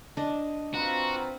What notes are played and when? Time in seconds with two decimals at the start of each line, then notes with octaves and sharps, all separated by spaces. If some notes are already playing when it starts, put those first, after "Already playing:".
0.17 D4 D#5
0.74 C4 F4 F#4 B4 A#5